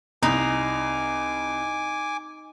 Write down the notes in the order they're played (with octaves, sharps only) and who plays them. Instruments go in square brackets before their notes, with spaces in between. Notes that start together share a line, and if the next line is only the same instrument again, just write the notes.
[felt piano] C2 [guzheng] D#4 [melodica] G#5 D6